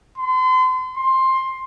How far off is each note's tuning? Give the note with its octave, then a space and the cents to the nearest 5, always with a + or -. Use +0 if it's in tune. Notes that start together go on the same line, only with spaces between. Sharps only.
C6 -35
C6 +10